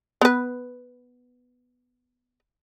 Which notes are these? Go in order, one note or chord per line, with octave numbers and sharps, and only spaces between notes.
B3 B4